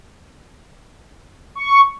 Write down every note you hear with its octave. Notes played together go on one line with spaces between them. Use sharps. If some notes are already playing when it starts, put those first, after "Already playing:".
C#6